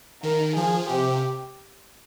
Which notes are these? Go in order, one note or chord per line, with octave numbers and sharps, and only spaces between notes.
D#3 A#4
F3 G#4
C3 G4